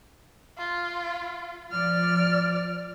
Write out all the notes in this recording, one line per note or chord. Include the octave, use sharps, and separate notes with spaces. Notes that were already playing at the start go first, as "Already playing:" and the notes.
F4
F3 D5 F6